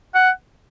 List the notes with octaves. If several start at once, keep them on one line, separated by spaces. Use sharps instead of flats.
F#5